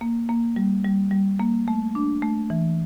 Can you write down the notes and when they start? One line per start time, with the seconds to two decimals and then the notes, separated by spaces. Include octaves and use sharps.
0.01 A#3
0.29 A#3
0.56 G3
0.84 G3
1.11 G3
1.40 A#3
1.68 A3
1.95 D4
2.22 A3
2.50 E3